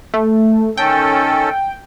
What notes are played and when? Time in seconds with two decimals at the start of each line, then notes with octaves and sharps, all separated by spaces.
0.14 A3
0.77 D#3 C#4 A4 G5